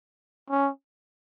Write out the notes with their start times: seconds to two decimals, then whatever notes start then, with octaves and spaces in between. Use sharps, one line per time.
0.50 C#4